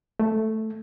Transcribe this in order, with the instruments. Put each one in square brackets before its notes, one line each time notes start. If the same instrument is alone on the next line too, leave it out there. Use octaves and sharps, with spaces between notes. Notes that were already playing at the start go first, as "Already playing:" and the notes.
[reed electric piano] A3